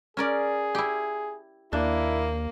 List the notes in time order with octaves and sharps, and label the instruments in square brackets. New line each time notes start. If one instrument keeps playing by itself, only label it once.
[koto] C#4 A#4 D5 [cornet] G#4
[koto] E4 G4
[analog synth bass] D#2 [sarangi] A#3 [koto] D4 [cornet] E4